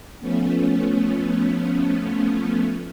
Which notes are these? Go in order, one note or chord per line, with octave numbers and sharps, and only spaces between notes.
F3 A3 B3 C#4